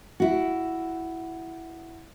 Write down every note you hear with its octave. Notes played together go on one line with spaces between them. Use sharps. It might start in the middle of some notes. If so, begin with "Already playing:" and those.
E4 F#4